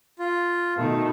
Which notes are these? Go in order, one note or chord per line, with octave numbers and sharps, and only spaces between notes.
F4
B2 D#3 A3